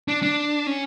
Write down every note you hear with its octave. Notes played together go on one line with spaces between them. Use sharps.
D4
D4
C#4